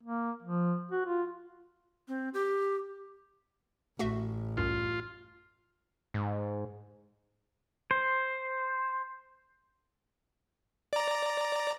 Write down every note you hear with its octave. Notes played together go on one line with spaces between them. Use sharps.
A#3
F3
F#4
F4
C4
G4
A1 A3 F#4 E5
C2 F#2 F4
G#2
C5
D5 A#5